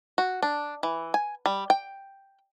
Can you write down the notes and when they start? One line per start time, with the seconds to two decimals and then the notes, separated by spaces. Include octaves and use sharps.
0.18 F#4
0.42 D4
0.83 E3
1.14 G#5
1.46 G3
1.70 G5